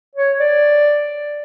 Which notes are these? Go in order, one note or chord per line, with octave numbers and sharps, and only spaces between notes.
C#5
D5